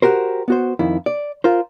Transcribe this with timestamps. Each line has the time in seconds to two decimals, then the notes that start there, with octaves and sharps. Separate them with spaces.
0.02 F#4 G4 A#4 C5
0.48 B3 F#4 C5
0.79 F2 D#3 E4
1.06 D5
1.44 F4 A#4 C5